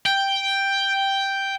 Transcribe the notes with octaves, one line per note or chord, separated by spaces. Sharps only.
G5